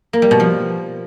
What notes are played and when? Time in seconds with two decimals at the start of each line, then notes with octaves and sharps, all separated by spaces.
0.13 A#3
0.22 G3
0.31 B2
0.40 F3